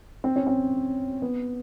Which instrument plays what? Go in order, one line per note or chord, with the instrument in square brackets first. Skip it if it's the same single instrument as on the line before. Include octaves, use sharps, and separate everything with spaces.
[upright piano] C4
C#4
C4
B3